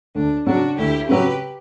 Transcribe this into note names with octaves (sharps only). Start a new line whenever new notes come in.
D2 D4
C#3 F#3 C#4 D4 F#4
D2 E4 G4
C#3 F#3 C#4 G4 B4